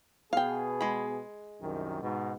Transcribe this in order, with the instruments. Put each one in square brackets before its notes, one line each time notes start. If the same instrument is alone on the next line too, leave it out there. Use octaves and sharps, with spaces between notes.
[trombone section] B2 B3 G#4 [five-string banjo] F5 G5
[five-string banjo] G#3 B5
[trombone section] C2 F#2 D#3
G#2 B2